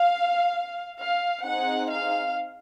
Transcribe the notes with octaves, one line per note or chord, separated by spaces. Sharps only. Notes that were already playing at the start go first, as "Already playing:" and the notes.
Already playing: F5
F5
C4 D#4 G#4 F#5
F5